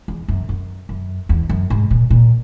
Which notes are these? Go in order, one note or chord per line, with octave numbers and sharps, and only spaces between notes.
E2
F#2
F#2
F#2
E2
F#2
G#2
A#2
A#2